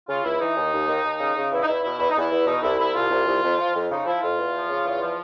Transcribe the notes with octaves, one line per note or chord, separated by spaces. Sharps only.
C#3 F4
C#2 E4
E3 D#4
D#2
D#2
D#2
D#2
C#3
C#3
E2 E4
D#4
E2 E4
B2 E4
E2 E4
D#4
E2 E4
E2
B2 D#4
C2 E4
C2 E4
C2 F4
C2
C2
F2
F3
F2
C#3 D#4
F3 E4
F2 F4
E2
F3
C#3
E2
F3